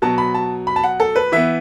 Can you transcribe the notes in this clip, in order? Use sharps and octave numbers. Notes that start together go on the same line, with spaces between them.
B2 F#3 B3 A5
B5
A5
B5
A5
F#5
A4
B4
E3 B3 E5